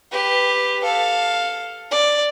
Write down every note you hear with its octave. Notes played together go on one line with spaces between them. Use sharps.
G4 B4
A4 F5
D5